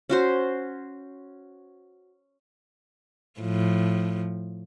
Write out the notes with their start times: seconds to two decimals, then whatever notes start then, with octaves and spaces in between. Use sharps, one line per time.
0.10 C#4 F#4 C5
3.40 A2 F3